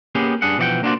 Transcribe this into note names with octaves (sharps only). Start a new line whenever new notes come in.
A#3 B3 C#4 G4 G#4
G2 D4 G#4 F#5
B2 E3 F3 D5 F#5 G5
A#3 D4 F4 F#4 C5 D5